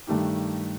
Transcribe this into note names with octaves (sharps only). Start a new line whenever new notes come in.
G2 D#3 A3 D#4 G4